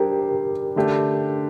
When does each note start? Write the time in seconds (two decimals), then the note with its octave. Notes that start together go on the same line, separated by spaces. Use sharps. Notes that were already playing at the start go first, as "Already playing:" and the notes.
Already playing: G3 D4 G4 A#4 C5
0.76 D3 A3 D4 G4